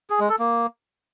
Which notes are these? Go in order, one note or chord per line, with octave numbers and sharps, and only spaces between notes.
G#4
G#3
A4
A#3